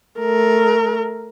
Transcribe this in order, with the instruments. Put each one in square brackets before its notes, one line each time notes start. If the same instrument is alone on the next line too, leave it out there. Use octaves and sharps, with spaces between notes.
[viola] A3 A#4